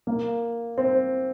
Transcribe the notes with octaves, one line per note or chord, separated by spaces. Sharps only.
A#3
C4